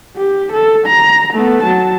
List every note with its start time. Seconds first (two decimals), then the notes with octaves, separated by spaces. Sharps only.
0.17 G4
0.52 A4
0.86 A#5
1.33 A3 B3
1.63 F#3 A5